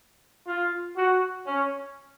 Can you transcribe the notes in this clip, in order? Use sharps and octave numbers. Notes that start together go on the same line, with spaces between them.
F4
F#4
C#4